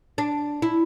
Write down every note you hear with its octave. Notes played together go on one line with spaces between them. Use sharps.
D4
E4